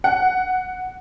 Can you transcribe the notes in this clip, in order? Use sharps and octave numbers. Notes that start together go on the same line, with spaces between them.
F#5